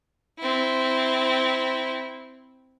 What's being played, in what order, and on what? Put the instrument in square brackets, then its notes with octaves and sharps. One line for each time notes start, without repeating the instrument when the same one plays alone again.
[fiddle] C4 E4